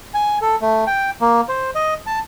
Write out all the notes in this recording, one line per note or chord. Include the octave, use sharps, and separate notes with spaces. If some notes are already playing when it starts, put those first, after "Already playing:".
G#5
A4
A3
G5
A#3
C5
D#5
A5